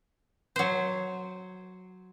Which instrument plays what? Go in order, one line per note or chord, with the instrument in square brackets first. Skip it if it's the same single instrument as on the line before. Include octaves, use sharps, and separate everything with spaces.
[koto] F#3 C5